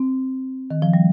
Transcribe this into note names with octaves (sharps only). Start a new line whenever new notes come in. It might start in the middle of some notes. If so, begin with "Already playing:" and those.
Already playing: C4
D#3
F3
G3